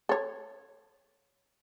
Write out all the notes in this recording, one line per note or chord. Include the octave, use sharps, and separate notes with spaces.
A4 C#5